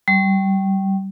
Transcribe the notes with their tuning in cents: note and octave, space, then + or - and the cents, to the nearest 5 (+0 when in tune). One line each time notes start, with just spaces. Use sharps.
G3 -20